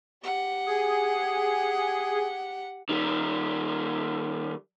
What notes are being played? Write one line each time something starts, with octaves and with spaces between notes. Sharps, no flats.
G4 F#5
G#4
D#3 G3